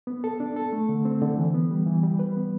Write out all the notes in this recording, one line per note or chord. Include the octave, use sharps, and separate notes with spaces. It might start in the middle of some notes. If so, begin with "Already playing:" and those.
B3
A4
D4
A4
A3
D3
C4
D3
E3
B3
G3
E3
G3
B4
B3